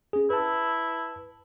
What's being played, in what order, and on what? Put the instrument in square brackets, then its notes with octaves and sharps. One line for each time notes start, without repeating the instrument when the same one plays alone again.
[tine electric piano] C#4 G#4
[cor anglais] E4 [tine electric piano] B4 A5